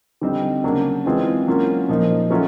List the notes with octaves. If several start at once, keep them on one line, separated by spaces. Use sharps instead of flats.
D3 G3 C4 D#4
C#3 F#3 A#3 D4
E3 G#3 C4 F4 G#4
F#3 A#3 C#4 F4
A#2 F3 A#3 D#4
F#3 A3 C#4 F4